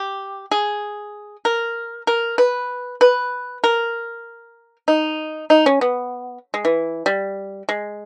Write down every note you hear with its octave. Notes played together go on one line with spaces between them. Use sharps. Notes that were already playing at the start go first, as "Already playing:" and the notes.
Already playing: G4
G#4
A#4
A#4
B4
B4
A#4
D#4
D#4
C#4
B3
G#3
E3
G3
G#3